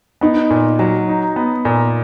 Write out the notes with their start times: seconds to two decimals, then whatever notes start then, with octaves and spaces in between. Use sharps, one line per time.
0.21 B3 D#4
0.50 A#2
0.79 F#3
1.09 D#4
1.36 B3
1.65 A#2